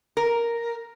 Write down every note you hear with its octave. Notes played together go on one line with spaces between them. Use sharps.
A#4